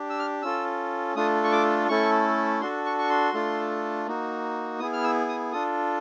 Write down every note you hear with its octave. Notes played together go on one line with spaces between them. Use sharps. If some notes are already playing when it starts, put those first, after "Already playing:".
Already playing: D4 G4
E6
F6
C#4 F4 A4 E6
A3 D4 F4 A4 D#6
C#6
D6
A3 C#4 E4 A4 C#6
D4 F#4 A4 C6
C#6
C#6
C6
A3 D4 F4 A4
A#3 D#4 F#4
B3 E4 G#4 D#6
F6
E6
D#6
D4 F4 A4 D#6